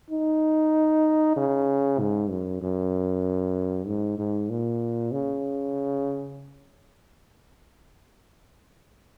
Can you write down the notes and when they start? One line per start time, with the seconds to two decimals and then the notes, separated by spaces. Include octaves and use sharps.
0.10 D#4
1.36 C#3
1.99 G#2
2.30 F#2
2.61 F#2
3.87 G#2
4.18 G#2
4.50 A#2
5.12 C#3